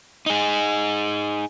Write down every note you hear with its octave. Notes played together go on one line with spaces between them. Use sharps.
D#4 G#4